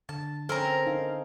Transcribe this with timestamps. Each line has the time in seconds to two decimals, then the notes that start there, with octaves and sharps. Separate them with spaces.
0.09 D3 A5
0.49 C4 C#4 A4 A#4 A#5
0.87 D#4 F5